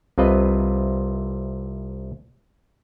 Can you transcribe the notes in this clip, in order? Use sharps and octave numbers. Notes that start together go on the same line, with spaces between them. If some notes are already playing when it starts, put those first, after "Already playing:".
C2 C3 F4 B4 D#5